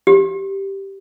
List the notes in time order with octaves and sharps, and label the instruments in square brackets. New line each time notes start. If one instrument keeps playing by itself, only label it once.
[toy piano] G4